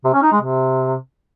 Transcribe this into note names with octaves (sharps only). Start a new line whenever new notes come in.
C3
C#4
D#4
G#3
C3